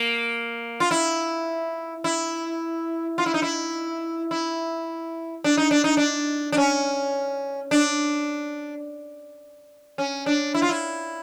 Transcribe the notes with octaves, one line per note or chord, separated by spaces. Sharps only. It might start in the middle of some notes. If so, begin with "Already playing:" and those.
Already playing: A#3
F4
E4
E4
F4
E4
D#4
E4
E4
D4
D#4
D4
D#4
D4
D4
C#4
D4
C#4
D4
E4
F4
E4